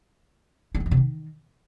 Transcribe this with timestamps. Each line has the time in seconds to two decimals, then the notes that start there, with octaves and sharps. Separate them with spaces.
0.75 G3
0.80 E3
0.86 F2
0.91 C3
0.97 D#3